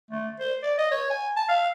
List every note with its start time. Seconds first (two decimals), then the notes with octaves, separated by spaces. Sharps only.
0.11 A3
0.40 C5
0.63 D5
0.78 D#5
0.91 C#5
1.10 G#5
1.37 A5
1.48 F5